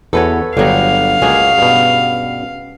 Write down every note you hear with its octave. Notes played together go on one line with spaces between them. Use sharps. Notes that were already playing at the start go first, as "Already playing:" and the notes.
E2 F#4 A4 B4 C#5
G1 D3 F#3 G3 G#4 F5 A#5
C#2 A#3 C#4 F#4 G#4
G2 B2